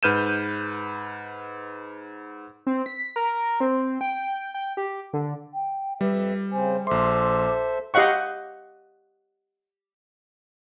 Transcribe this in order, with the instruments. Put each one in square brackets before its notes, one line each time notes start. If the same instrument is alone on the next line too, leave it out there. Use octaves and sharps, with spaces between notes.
[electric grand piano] G#2 B4 F6 G6 D#7 E7
[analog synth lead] C4
B6
A#4
C4
G5
G5
G4
D3
[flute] G5
[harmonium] F2 E5 [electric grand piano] G3 [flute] B4
[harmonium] C#3 C4 C5 [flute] G#5
[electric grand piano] A#1 C6 [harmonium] A4 C5 E5 [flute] D6
[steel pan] G4 D#5 F5 F#5 C#6